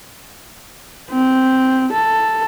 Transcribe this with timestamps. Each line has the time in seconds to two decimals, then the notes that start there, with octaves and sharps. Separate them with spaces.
1.11 C4
1.92 A4